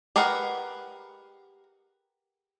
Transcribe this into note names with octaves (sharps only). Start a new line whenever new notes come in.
G4 G#4 A#4 B4 F#5